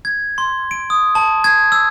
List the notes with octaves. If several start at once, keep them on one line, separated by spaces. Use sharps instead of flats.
G#6
C6
D7
D#6
A5
G#6
E6